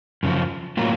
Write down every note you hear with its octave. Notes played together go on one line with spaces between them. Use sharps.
F#2 C#3 F3
A2 F#3 A#3 F4